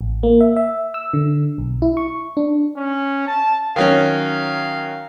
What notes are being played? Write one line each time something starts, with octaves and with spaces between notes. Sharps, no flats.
A1
A#3
E5
E5
E6
D3
B1
E4
C#6
D4
C#4
A5
D#3 F#3 C#4 F5